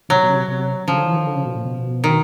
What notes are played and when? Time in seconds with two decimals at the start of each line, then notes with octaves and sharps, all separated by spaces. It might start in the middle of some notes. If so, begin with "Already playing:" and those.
0.09 C3 F#3
0.23 B2
0.29 C#3
0.36 C3
0.48 C3
0.87 C#3 F3
0.97 D3
1.07 E3
1.16 D#3
1.26 D3
1.35 C#3
1.45 B2
1.55 A#2
1.65 B2
2.04 D#3